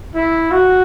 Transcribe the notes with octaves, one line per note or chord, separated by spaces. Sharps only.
E4
F#4